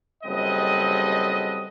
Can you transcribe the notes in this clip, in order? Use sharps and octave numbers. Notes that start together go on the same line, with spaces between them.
F#1 G3 C4 A4 B4 D#5